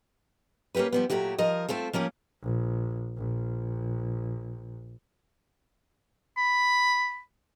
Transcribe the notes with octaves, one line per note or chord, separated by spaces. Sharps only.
A#3 C#4 F#4 G4 B4
F3 G3 B3
A#2 F#3 A3 F#4 G4
F3 A#4 D#5
A3 C4 F4 A4
F3 A#3 C#4 G4
A#1
A#1
B5